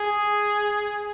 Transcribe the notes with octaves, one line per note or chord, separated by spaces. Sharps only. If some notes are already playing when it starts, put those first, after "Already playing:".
Already playing: G#4